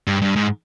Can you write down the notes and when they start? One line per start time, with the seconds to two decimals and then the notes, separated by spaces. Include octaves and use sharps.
0.07 G2
0.21 G2
0.36 G#2